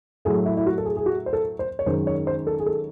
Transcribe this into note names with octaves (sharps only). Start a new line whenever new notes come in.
A2 F#3 A3 G#4
E4
E4
F#4
A4
G#4
G#4
F#4
C5
A4
C5
C#5
F#2 D#3 G#3 C5
C#5
C5
A4
G#4
A4